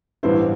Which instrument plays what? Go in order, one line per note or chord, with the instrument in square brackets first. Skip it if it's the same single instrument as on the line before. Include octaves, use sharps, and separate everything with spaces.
[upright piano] A1 G2 E3 B3 E4 C5